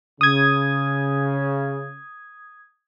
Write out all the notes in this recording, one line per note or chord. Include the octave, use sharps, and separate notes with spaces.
C#3 D#6 G#6